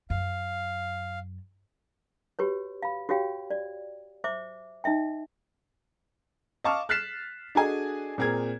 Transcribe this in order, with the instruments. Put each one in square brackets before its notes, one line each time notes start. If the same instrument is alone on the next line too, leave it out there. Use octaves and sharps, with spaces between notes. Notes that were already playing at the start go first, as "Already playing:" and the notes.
[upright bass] F#2 [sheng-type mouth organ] F5
[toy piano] F#4 G4 B4 C#5
F5 B5
F#4 G4 C#5 F5 G5
D5
C5 E5 D6
D#4 D#5 E5 G5
[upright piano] D#5 F5 A5 C#6 D6 F6
F6 F#6 A6 B6 C7 E7
D4 F#4 G#4 A4 D#5 G#5
A#2 C4 G#4 A#4 G#6